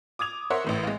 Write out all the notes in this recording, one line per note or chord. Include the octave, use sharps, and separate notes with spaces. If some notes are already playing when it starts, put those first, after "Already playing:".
D6 D#6 G#6 F7
A#4 C5 C#5 E5 F#5 C6
A1 A2 E3
G#3 F5